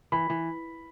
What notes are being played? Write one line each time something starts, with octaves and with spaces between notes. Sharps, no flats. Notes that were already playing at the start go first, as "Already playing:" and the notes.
E3 B5
E3